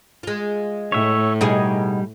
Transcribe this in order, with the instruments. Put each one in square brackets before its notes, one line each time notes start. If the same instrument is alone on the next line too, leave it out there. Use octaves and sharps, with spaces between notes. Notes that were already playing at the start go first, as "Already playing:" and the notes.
[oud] G#3 F4
[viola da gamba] A2 [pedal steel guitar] C#5 E5
[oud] B2 D#4 G#4 [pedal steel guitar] G3